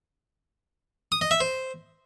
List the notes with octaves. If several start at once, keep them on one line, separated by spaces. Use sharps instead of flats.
D#6
D#5
E5
C5